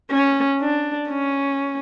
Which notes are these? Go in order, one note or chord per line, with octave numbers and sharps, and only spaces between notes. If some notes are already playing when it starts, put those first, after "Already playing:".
C#4
D4
C#4